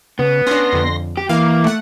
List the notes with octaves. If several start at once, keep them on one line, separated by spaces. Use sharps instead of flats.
C#3 B3
C#4 D4 C6 A#6
F2 D3
G4
E3 A#3 F5
A3 F#5